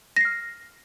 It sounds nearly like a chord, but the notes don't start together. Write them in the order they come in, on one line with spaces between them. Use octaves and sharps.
A#6 C7 F6